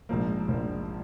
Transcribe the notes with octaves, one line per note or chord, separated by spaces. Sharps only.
A#1 G#2 F3 A#3
A#1 G#2 F3 A#3